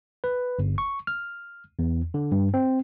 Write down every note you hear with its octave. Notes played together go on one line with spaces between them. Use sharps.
B4
G1
C#6
F6
E2
D3
G2
C4